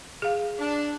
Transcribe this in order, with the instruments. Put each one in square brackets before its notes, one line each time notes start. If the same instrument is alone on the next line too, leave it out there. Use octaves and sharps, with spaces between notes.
[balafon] G#4 F5
[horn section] D4